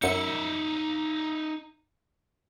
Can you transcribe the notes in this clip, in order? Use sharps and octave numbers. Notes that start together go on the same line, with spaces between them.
F#2 D#4 E5 C#7